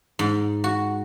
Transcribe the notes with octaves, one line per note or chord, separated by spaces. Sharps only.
G#2
F#4